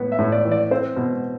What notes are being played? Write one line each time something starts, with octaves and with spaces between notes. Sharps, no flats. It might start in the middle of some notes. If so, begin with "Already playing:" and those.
Already playing: A2 B3
E5
A2
D5
E3
D5
C4 C5
B2